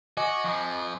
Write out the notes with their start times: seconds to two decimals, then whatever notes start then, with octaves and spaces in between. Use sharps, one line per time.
0.17 F#4 D#5 G#5 D6
0.44 F2 F3